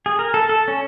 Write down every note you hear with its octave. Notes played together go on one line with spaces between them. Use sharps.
G#4
A#4
A4
A4
C#4